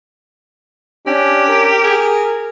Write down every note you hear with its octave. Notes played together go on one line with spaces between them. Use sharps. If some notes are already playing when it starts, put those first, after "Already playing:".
C#4 D4 G4
A#4
G#4